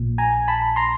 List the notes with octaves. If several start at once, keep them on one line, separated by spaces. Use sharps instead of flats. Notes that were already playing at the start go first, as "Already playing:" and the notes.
Already playing: A#1 A#2
G#5 A#5
A5 B5
A#5 C6